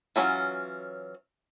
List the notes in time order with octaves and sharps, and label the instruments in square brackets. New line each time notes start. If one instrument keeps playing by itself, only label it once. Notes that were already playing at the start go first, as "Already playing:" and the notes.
[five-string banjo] E3 F#3 C#4 F4